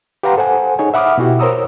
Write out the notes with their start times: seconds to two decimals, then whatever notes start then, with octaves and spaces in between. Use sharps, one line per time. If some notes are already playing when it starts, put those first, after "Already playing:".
0.23 G4 B4 F5 F#5 A#5 C6
0.37 A4 C5 F#5 G#5
0.79 D#4 G#4 C#5 G#5
0.94 E5 F#5 B5 D6 D#6 F6
1.18 B2 E4 F#4 G4
1.39 A#4 C5 C#5 A#5 D#6 E6